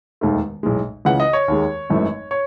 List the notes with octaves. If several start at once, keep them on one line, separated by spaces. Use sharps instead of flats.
E1 D#2 D#3 A3
B1 A2 G#3
C#2 C#3 E3 F#5
D#5
C#5
D#2 D#3 G#3
G#1 F#2 E3 A3
C#5